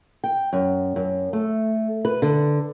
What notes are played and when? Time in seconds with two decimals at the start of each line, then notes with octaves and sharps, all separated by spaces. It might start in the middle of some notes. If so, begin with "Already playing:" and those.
0.24 G5
0.53 F#2
0.96 F#2
1.33 A3
2.05 B4
2.22 D3